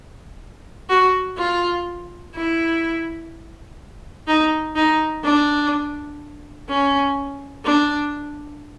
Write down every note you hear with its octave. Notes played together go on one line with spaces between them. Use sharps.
F#4
F4
E4
D#4
D#4
D4
C#4
D4